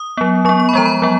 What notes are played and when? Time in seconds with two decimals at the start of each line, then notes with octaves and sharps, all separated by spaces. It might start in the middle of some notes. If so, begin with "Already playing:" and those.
Already playing: D#6
0.17 F#3 B3
0.45 F#3 B3 C#6
0.60 C#6
0.69 B5
0.73 F3 G#3 B3 A#5
0.85 B5
1.02 F#3 B3